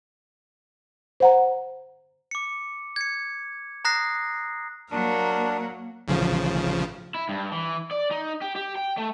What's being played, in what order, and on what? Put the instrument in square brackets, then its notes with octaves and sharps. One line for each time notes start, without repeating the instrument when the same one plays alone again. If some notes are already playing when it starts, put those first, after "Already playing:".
[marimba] C5 F#5 A#5
[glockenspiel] D6 C#7
G#6 C#7
A#5 D#6 F#6 A#6 C7
[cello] F#3 [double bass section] A#3 [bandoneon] D4 [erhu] A#4
[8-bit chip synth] A1 C#3 F3
[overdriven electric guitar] E4
G2
E3
D5
D#4
G4
G4
G5
A3